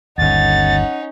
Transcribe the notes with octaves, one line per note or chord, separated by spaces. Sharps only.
G1 D#2 C#4 D#4 F#5 A6